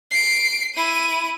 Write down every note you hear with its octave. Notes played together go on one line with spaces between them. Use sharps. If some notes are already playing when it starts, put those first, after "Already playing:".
C7 D7
E4 D#7